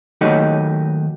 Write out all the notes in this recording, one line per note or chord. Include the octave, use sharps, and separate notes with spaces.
D#2 F#3 A3 D#4 G4